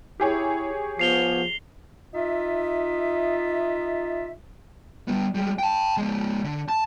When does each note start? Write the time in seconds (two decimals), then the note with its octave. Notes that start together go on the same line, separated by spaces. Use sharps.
0.20 E4 G4 G#4 C#5
0.99 F3 B3 C7 F7 G7
2.14 D#4 F4 E5
5.08 G3 B3
5.35 G3 G#3
5.59 G5 A5
5.97 F3 G#3
6.44 D3
6.69 A5